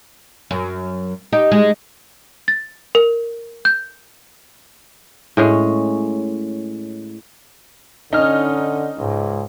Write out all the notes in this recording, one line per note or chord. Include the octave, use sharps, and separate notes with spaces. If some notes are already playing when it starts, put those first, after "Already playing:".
F#2
D#4 G4
G#3 D#5
A6
A#4
G6
A2 G#3 C#4
D3 C#4 D#4 F6
C#2 G#2